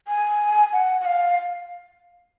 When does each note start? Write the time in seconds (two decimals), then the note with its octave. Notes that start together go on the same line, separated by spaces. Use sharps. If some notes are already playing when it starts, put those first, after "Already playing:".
0.08 G#5
0.73 F#5
1.01 F#5
1.06 F5